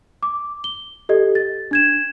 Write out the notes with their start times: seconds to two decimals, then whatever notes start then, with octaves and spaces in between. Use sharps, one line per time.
0.23 D6
0.64 G7
1.09 G4 A4 D#5
1.35 A6
1.71 D4 G#6 E7